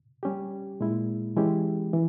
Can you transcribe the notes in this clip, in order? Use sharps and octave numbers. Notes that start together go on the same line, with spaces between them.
G3 C#4 G4
A#2 G#3 E4
E3 G#3 C#4 E4 G4
E3